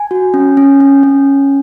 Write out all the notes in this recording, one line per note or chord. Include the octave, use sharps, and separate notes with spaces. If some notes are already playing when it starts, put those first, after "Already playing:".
Already playing: G#5
F#4
C#4
C#4
C#4
C#4